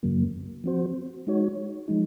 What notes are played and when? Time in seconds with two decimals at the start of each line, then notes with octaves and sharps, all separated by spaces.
0.03 F#2 C#3 F#3 A#3
0.64 F3 C4 F#4 C5
1.27 G#3 D#4 F#4 C#5
1.88 F3 G#3 D#4